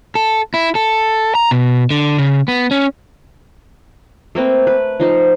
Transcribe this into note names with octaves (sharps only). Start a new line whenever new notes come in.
A4
E4
A4
A#5
B2
D3
C#3
B3
C#4
A3 A#3 C4 B4
B4
F3 D#4 C5